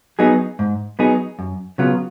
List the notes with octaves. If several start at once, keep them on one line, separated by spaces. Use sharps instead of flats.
F#3 B3 D#4 G#4
G#2
F#3 B3 D#4 G#4
F#2
C#3 F#3 B3 F4